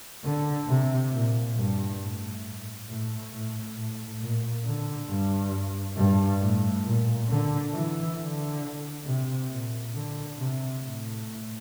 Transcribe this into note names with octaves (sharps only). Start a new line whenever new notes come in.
D3
C3
A#2
G2
A2
A2
A2
A2
A#2
D3
G2
G2
A2
A#2
D3
E3
D3
C3
A#2
D3
C3
A2